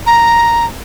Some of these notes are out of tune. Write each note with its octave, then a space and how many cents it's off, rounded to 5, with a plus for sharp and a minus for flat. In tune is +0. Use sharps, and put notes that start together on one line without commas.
A#5 +0